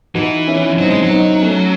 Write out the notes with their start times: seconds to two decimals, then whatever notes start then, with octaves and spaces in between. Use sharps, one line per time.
0.15 E3 D#4 F#4
0.47 C#4 E4
0.78 F#3 C4 D#4
0.90 G#3
1.02 F#3
1.10 C4 D#4
1.42 A3 C#4